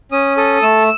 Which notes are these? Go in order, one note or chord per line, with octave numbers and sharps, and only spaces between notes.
C#4 D#6
A4 D#6
A3 E6